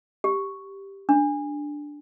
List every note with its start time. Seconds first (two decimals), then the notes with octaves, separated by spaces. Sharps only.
0.24 G4
1.09 D4